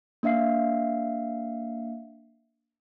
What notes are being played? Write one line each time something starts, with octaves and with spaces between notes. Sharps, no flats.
A#3 D4 E5 F5 C7